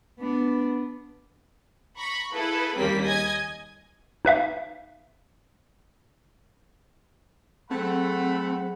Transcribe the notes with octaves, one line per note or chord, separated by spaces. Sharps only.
B3 D4
A#5 B5 C#6
E4 G#4 A4 B4 F5
D#2 C#3 G3 A#3 C4 B6
D#5 G#5 G#6
D#4 B4 E5 F5
F#3 A3 C4 G#4 F#5 B5